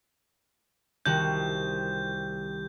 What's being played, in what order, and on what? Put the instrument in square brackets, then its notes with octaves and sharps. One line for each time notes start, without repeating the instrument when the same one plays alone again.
[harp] C2 D#3 F#4 [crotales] G6